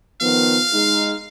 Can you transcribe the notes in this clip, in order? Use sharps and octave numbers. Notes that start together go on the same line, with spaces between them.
D#3 F3 B3 F5
G#3 D#4